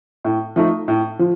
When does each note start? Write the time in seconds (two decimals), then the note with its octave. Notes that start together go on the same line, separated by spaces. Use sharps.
0.25 A2
0.56 F3 A3 D#4
0.88 A2
1.19 F3